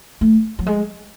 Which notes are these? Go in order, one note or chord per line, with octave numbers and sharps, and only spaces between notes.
A3
F#3
G#3